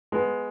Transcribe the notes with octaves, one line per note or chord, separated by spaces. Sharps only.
G#3 B3